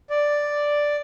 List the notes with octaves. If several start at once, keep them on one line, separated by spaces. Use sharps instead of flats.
D5